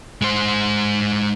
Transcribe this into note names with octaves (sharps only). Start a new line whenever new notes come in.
G#3 C5